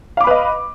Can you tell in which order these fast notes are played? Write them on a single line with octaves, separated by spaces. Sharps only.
F5 D6 B5 B4 D#5